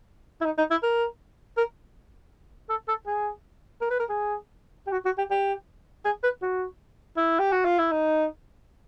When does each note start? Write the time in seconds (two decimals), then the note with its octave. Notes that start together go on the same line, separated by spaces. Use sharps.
0.41 E4
0.45 D#4
0.58 D#4
0.71 E4
0.83 A#4
1.57 A#4
2.70 A4
2.88 A4
3.07 G#4
3.81 A#4
3.91 B4
4.00 A#4
4.10 G#4
4.87 G4
4.93 F#4
5.05 F#4
5.18 G4
5.31 G4
6.05 G#4
6.23 B4
6.42 F#4
7.17 E4
7.40 G4
7.52 F#4
7.65 F4
7.79 E4
7.92 D#4